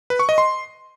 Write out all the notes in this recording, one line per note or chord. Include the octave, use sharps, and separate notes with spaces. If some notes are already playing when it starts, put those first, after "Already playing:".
B4
C#6
D#5
C6